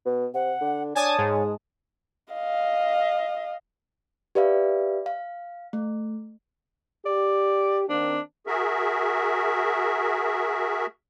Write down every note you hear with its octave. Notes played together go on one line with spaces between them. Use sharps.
B2
C3 F#5
D3
D4 C#5 G#5 A5 D#6
G#2 G#3
D#5 F5
G4 B4 D5 E5 F5
F5
A3
G4 D5
D#3 A#3 C4 D4
F#4 G#4 A#4 E5